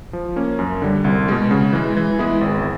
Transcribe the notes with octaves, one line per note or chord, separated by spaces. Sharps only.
F3
A#3 C#4
F#2
D3 G3
C2
B2 G#3
C#3
E3 G#3
E3
G#3 B3 E4 G#4
G#1